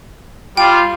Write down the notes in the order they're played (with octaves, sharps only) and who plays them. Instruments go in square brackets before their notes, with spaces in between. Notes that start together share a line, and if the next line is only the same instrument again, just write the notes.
[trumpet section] G3 F4 [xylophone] G5